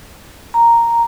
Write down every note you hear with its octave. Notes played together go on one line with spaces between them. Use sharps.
A#5